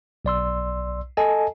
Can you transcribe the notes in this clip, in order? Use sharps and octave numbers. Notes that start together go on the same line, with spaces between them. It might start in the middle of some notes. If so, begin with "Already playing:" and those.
B1 D5 C6 E6
A4 D#5 G#5 A5